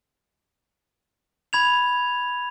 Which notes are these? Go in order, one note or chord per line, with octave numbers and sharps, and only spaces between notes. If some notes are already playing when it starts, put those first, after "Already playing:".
B5 G#6 F7